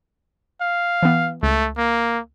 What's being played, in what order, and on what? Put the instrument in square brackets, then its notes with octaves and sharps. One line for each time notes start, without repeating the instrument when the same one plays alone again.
[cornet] F5
[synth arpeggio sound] E3 B3
[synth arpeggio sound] C#2 [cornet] A3
[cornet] A#3